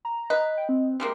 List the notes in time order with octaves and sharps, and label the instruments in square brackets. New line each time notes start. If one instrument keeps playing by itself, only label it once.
[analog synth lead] A#5
[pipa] B4 [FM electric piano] D#5
[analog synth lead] G5
C4
[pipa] G3 G#3 A#3